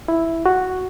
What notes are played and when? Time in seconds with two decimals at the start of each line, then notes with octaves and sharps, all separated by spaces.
0.08 E4
0.46 F#4